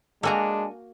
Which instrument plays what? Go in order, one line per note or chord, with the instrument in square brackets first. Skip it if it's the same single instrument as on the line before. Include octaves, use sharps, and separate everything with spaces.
[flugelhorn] G#3 [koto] A#3 F#4 A#5 [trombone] D4 [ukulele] A4 G#5